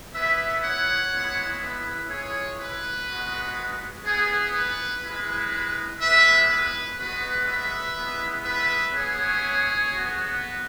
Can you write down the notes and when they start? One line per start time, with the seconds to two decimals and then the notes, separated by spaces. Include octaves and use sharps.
0.14 B3 E4 B4 E5
0.63 C#5 F#5
1.12 G#3 B3 E4
1.61 B4 E5
2.10 G#3 E4 G#4 C#5
2.59 B4
3.07 G#3 B3 F#4
4.05 B3 E4 G#4
4.55 B4
5.03 G#3 E4 B4
6.01 G#3 B3 E4 B4 E5
6.49 B4
6.98 G#3 B3 F#4 B4
7.47 B4 E5
7.96 G#3 B3 E4
8.45 B4 E5
8.93 B3 E4 G#4 C#5
9.92 B3 F#4